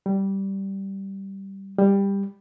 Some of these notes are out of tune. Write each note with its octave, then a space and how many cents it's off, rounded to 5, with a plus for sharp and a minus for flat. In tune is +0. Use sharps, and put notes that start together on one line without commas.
G3 -10
G3 +15